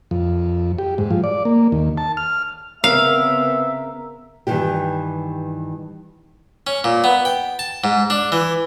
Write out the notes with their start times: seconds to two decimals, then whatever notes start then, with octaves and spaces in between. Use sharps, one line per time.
0.11 F2
0.78 G4
0.98 G#2
1.11 F3
1.24 D5
1.45 A#3
1.72 D#2
1.97 A5
2.17 F6
2.84 C#3 B3 C4 A#4 E5 F5
4.47 G2 D#3 E3 G4
6.67 C#4
6.84 A#2
7.04 B3
7.25 G5
7.59 A5
7.84 G#2
8.10 D4
8.32 E3